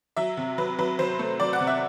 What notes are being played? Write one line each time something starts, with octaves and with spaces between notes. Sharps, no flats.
F#3 E5
C3
F#3 B4
F#3 B4
F#3 C5
A3
F#3 D5
F#5
C3
E5